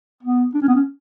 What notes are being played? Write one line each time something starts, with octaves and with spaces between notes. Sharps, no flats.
B3
D4
C#4
B3
C#4